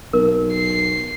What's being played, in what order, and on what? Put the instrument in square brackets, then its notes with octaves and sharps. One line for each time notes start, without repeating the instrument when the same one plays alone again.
[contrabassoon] B1 [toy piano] A#4
[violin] C7